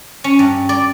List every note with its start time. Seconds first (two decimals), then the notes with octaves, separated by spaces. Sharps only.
0.24 C#4
0.39 G2
0.69 D5